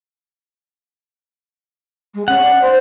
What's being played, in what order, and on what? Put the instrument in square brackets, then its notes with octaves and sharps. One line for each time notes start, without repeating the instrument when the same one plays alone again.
[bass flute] G#3
[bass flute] C#4 [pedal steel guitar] F#5
[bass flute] D5
C5